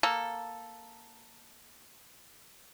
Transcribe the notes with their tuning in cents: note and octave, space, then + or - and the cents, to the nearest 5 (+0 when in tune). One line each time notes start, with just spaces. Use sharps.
A#3 +0 A4 +0